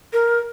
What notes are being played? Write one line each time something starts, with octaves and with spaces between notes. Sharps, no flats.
A#4